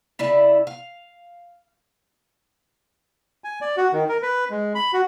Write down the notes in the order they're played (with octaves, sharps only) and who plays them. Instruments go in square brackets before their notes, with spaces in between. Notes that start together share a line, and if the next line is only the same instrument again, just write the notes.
[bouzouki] C#3 E4 D5 E5
F5
[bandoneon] G#5
D5
F#4
D#3
A#4
B4
G#3
B5
F#4